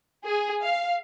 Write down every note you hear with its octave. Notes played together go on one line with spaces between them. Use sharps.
G#4
F5